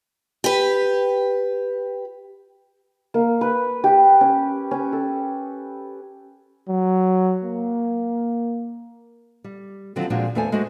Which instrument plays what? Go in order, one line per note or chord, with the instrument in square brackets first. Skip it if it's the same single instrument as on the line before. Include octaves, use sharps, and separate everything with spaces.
[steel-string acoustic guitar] G4 B4
[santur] A#3
B4
G4
C#4
C#4
A4
[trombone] F#3
A#3
[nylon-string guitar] G3
D3 D#3 F3 F#3 C4 D4
A#2 F3 G#3 A#3 D4 F#4
E2 A3 A4 C5 G#5
G#3 A3 D4 F#4 C5